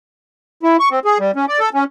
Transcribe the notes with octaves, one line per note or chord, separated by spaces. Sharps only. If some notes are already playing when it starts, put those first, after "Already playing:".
E4
C#6
C4
G#4
G3
C#4
D5
A4
C#4